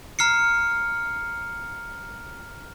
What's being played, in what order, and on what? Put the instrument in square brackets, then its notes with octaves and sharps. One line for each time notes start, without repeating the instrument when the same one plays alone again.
[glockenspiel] A#5 F6 C7 C#7